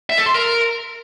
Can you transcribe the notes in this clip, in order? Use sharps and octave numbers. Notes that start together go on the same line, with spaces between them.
E5
A4
C6
A#4